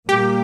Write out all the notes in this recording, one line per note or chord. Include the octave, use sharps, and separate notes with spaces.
A#2 G3 A#3 G4